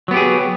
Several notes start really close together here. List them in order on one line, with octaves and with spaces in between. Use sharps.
F#3 B3 G4 G#4